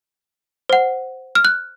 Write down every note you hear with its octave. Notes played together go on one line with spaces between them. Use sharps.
C5 F#5
F6
F#6